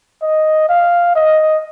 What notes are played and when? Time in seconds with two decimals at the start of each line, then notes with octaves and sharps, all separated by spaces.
0.22 D#5
0.69 F5
1.16 D#5